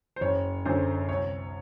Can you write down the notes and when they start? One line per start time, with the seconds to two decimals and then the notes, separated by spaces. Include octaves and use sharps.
0.16 C5
0.21 F#1 C#5
0.65 F#2 D3 F#3 C5
1.09 C2 C#5